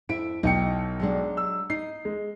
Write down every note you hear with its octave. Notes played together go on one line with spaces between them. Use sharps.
F2 E4 E5 D7
B1 D#4 G5 C#7
F#3 G#3 D4
E6
D#4 C7
G#3